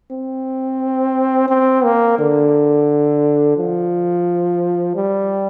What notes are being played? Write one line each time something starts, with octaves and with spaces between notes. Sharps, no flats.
C4
C4
A#3
D3
F3
G3